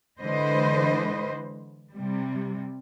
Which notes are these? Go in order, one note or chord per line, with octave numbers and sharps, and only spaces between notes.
D3 E3 G#3 B4 C5 D#5
C3 G3